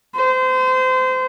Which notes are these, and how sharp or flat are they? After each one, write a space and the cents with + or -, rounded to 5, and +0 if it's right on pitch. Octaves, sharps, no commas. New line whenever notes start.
C5 -30